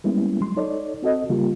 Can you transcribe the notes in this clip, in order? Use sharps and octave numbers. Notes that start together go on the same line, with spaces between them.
G3 G#3 A#3 B3 C#4 E4
F#3 G#3 C6
D#4 A4 C#5 D5
C4 F#4 A4 D#5
C#3 G3 A#3 F4 G4